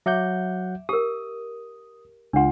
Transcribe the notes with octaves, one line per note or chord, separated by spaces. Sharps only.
F#3 E5 F#5 D6 G6
G4 A#4 D#6
C#2 D4 F4 F#5